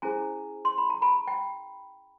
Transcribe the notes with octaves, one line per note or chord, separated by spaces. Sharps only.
C#4 E4 G#4 C5 G#5 A#5
C6
B5
A#5
A5 B5
G5